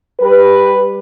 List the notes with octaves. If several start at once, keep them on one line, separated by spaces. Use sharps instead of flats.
G3 G4 B4